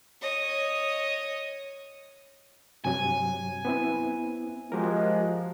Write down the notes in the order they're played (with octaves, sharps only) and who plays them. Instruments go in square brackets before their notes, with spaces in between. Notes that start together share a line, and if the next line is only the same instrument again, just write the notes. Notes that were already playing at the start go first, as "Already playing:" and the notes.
[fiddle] C#5 D#5
[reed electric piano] G2 C3 F#3 [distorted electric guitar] G#5
[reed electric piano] B3 C4 E4
[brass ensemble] F3 G#3 [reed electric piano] F#4 G4 A#4